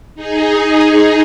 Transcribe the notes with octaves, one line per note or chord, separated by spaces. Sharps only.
D#4 G#4